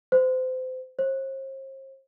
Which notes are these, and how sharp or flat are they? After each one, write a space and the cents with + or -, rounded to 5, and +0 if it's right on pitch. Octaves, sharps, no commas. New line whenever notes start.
C5 -30
C5 +40